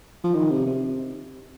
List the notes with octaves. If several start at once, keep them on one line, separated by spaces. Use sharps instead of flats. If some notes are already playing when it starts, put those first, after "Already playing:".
F3
D#3
C3
C3